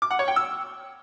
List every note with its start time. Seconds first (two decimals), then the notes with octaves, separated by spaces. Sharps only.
0.02 D6
0.11 F#5
0.19 C#5
0.28 G5
0.36 E6